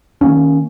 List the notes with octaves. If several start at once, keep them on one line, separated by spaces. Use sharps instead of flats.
D#3 A#3 C#4